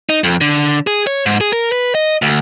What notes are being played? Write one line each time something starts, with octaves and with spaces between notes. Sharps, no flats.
D#4
F2
D3
G#4
C#5
G#2
G#4
A#4
B4
D#5
D2